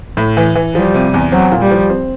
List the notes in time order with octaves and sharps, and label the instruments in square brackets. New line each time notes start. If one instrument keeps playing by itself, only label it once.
[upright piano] A2
E3
E3
[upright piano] F3 [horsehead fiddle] G3
[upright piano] C3
E2
[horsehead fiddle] F#3 [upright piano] C4
[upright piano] A#2
[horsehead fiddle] G3
[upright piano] F3
C4